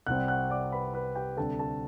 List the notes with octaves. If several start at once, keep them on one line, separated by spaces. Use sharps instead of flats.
C2 C3 G3 C4 F#5 F#6
F#5 F#6
D5 D6
B4 B5
B4 B5
G4 G5
D2 C3 G3 D4 A4 A5
A4 A5